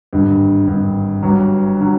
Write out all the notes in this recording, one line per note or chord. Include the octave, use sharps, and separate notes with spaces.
G#1 G2 D3
G#1 G2 D3
G1 G2 D3 F#3
D3 F#3